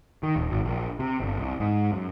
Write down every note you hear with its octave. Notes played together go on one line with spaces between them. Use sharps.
D#3
D#1
G#1
A#1
C3
G1
C2
G#2
F#2